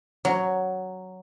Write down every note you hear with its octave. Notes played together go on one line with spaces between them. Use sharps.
F#3